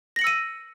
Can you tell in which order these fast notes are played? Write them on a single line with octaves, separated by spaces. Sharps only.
A#6 F#7 C#7 E6 D#7